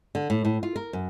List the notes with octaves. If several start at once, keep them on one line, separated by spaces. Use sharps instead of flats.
D3
A2
A2
F4
A#4
F#2